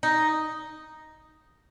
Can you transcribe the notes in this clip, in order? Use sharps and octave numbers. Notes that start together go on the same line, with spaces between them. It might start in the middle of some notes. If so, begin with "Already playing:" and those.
D#4